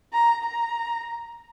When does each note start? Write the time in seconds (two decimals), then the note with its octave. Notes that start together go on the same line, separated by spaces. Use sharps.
0.13 A#5
0.44 A#5